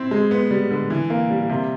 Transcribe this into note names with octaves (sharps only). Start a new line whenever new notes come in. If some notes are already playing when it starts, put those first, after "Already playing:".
Already playing: C4 E4
G#3
B3
G3
D3
E3
A#3
G3
C3